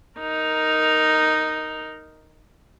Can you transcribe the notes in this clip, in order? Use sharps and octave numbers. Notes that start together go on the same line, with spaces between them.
D#4 A#4